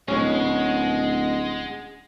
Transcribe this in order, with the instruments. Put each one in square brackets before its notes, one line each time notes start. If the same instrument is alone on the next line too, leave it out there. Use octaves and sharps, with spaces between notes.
[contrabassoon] D1 [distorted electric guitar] G#3 [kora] C#4 [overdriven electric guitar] D#5 F#5